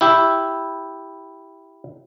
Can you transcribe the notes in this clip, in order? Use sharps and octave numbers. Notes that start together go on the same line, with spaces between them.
E4 G4 E5